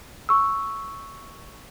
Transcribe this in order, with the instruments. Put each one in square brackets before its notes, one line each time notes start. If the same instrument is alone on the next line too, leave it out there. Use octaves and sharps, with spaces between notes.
[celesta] C#6 E6